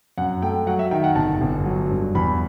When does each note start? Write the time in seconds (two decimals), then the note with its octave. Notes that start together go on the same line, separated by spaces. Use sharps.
0.18 F#2 F#5
0.42 A3 G5
0.67 F#3 F#5
0.79 E5
0.91 D#3 G5
1.04 F#5
1.15 G1 A5
1.41 G1
1.65 F#3
1.90 G2
2.15 E2 B5